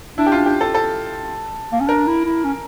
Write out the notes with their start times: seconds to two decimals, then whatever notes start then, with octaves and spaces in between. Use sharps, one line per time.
0.18 D4 E4
0.27 G4
0.32 F4
0.37 D4
0.46 G4
0.61 A4
0.74 A4
1.72 A#3
1.80 C#4
1.88 D4 A#4
2.07 E4
2.26 E4
2.44 C#4